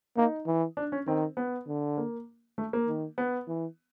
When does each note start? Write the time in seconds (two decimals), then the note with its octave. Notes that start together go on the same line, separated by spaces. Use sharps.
0.17 A#3 D#4
0.47 E3
0.77 D4
0.92 C#4
1.07 D#3 C4
1.37 B3
1.68 D3
1.98 A#3
2.58 A3
2.73 A#3
2.88 D#3
3.18 B3
3.48 E3